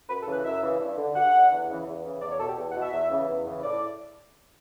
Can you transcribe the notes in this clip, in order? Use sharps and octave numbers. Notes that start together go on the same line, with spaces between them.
F#2 B4
A4
C#3 E3
B4
F#2 E5
C#3 E3
G2
D3
G2 F#5
D3
E2
C#3 E3
E2
C#3 E3
E2 D5
C#5
B2 A4
G4
E2
F#5
B2
E5
E2
C#3 E3
E2
C#3 E3
A2 D5